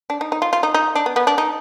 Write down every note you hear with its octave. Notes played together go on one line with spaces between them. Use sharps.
D4
D#4
D#4
F4
F4
D#4
D#4
D4
B3
B3
D4
D#4